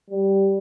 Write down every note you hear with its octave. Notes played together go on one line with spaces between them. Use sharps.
G3